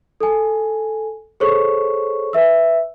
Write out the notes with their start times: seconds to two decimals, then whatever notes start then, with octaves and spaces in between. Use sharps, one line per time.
0.20 A4 G#5
1.40 G#4 A4 C5 C#5 C#6
2.33 B4 E5 E6